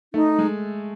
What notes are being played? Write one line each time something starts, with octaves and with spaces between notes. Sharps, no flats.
A3 D#4
G#3